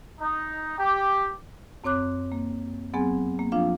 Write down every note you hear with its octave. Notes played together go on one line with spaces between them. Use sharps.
D#4
G4
F#2 C4 C#5 D6 F#6
A#3
F#3 B3 C4 G#4 G#5
A#3
F3 D4 F4 F5